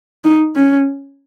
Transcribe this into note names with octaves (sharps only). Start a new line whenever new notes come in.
D#4
C#4